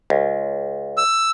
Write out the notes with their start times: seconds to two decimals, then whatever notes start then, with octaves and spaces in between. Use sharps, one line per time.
0.10 C#2
0.98 E6